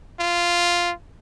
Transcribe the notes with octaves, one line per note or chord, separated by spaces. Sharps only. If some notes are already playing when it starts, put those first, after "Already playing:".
F4